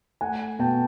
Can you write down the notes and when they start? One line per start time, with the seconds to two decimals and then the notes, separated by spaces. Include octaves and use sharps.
0.21 A3 F#5 G#5
0.59 B2 G5 A5